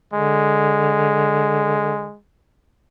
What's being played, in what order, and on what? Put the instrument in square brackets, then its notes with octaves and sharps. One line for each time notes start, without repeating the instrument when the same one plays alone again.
[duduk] D3 [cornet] G#3